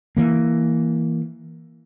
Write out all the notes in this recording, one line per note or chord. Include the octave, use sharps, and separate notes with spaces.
E3 A#3